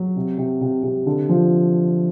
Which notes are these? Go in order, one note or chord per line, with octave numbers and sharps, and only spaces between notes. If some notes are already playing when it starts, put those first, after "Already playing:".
Already playing: F#3
C3
C3
C3
C3
D3
F3